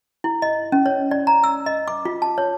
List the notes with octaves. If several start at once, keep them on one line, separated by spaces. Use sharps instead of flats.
E4
D#5
C#4
C#5
D5
A#5
E6
D#5
D6
F4
A5
C#5